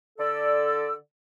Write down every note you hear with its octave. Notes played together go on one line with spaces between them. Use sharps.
D3 A4 D5 E6